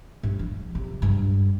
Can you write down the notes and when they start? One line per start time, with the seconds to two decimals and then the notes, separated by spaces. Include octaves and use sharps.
0.23 G2
0.39 F3
0.75 C3
1.02 G2